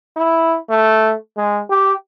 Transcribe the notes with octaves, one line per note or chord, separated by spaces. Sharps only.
E4
A3
G#3
G4